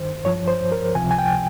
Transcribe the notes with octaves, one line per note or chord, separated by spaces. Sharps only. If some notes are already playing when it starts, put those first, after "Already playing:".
Already playing: G2 D#3 C5
G2 F3 C#5
C5
A#4
C#2 C3 F3 G#5
G#5
G5